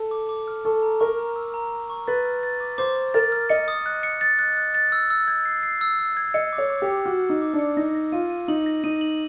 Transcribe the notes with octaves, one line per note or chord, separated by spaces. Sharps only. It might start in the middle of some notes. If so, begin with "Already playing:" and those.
Already playing: A4
D6
D6
F6
A4 C#6
A#5
A#4 C#6
A#5
E6
A#5
A#5
C#6
B4 A6
F6
A6
D6
C5 D6
D6
A#4 A6
F6
D#5 C#7
D#6
F#6
C#7
A6
F#6
F#6
A6
E6
E6
G#6
C7
C7
E6
E6
G#6
D#5 C#7
D6
C#5
D6
G4
C#7
F#4 F6
C#7
D#4
D6
D4
C#7
D#4 A#6
A#6
F4 D#7
D#7
D#4 F#7
A#6
D#4 D#7
F#7